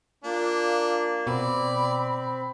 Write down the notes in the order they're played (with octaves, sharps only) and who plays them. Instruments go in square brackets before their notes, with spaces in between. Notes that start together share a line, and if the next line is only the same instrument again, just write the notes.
[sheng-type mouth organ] A#3 [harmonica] D4 [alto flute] F4
[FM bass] B2 [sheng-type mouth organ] C4 [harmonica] D5 [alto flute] B5